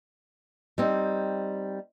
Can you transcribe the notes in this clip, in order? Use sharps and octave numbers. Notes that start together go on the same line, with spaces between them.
G3 C4 D#4